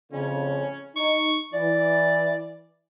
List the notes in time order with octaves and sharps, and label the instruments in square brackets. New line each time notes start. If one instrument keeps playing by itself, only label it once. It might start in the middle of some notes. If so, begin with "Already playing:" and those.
[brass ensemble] F2 A2 C#3 [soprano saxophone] C#4
[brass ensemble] D#4 [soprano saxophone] C#6
[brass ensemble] E3 [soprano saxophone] D5